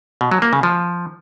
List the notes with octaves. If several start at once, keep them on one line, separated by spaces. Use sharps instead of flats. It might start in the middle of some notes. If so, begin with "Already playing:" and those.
B2
F#3
A#3
C#3
F3